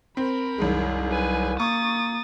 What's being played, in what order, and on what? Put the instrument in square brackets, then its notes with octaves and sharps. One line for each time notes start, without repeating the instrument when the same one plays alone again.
[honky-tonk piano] C4 [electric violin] A#4 B5
[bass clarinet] C2 [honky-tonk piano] F#2 D#3 G#3
[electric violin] B4 G#5
[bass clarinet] A#3 [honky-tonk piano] C#6 [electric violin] D#6 A6